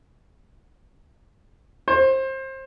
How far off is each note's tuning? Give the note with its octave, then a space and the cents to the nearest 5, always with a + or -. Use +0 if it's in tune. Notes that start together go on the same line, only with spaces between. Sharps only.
C5 +25